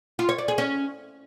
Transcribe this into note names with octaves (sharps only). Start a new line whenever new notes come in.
F4
C#5
D5
G#4
C#4